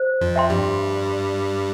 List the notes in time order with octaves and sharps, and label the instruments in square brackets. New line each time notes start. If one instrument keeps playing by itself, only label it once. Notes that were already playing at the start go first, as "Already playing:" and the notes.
Already playing: [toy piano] C5
[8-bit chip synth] F2 F3
[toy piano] E5 G5 C6
[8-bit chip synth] G2 G3